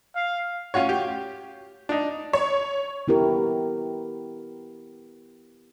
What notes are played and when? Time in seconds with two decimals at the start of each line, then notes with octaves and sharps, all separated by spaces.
0.15 F5
0.74 C#4 F4 F#4 C#5
0.89 G4
1.89 D4 D#4
2.33 C#5
3.08 B3 E4 G4 A#4